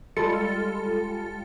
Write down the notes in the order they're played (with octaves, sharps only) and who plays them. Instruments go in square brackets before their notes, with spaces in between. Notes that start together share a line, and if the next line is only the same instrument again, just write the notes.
[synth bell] G3 G#3 F4 A4 A6 C#7